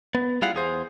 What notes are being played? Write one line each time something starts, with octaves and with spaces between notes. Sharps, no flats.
B3
G3 E4 F4 G#4 F5 F#5
E2 G#4 C5